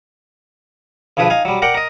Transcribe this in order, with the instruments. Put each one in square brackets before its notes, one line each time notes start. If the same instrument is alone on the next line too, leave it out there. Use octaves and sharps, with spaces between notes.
[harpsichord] D2 G2 F3 G#4 B4
D#4 F5 G#5
F#3 G3
A#4 D5 F#5 G5
A#4 D#5